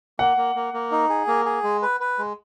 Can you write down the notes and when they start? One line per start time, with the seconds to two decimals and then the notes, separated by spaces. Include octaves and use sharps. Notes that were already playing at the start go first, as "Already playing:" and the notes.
0.19 A#3 F#5
0.37 A#3
0.55 A#3
0.74 A#3
0.91 D#4
1.09 G#4
1.27 A#3
1.45 G#4
1.63 G#3
1.82 B4
2.00 B4
2.19 G#3